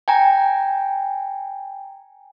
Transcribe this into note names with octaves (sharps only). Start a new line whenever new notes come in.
G5 G#5 A#5